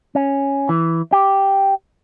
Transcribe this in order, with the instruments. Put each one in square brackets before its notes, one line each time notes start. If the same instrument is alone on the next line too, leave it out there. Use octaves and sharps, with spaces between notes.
[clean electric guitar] C#4
E3
G4